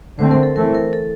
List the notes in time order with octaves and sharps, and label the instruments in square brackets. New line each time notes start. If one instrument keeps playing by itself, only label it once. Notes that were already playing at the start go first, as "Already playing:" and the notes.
[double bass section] D3 A3 C4 [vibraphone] C5
[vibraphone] A#4
A4
[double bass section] E3 A3 C4 [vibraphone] A#4
[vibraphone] A#4
A4